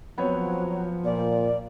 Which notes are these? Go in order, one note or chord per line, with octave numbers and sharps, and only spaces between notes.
F3 F#3 B3 C4 C#5
A#2 D5